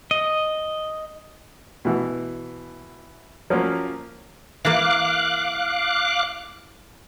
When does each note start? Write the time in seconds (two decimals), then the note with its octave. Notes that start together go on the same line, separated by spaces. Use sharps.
0.11 D#5
1.85 B2 E3
3.50 F3 F#3 A#3 C#4
4.65 E3 A#3 F5 D6 F#6